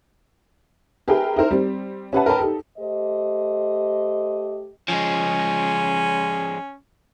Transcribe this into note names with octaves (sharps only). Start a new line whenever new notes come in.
G4 G#4 A#4 B4 E5 G5
D#4 E4 A#4 C5
G3 C4 G4
C#4 G4 B4 E5 F#5 A5
A#4 B4 C#5 G5 A5
D#4 G4 A4
A3 G4 C5 D#5
F3 G#3 C#4